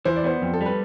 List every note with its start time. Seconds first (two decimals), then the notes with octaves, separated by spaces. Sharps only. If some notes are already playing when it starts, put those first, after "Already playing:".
0.05 E3 C5
0.16 D5
0.24 B3 C5
0.42 F2
0.53 A4
0.61 G3
0.66 B4